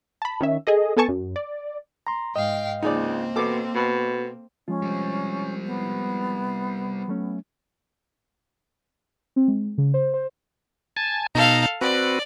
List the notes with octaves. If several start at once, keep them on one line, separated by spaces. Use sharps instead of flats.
A5 B5
D#3 C#4 E5
G#4 A4 D#5
B3 A4 G#5 A5 C#6
F#2
D5
A#5 C6
G#2 D#5 F5 G5
C#2 A#3 C4 D#4 G#4 D5
B2 A4 D6
B2
F3 G#3 C#4 F4
G3 C4
B3
F#3 A3 C#4
C4
G#3
C#3
C5
C5
G#5 A5
B2 D#4 A4 F5 A#5
C4 F#4 B4 D5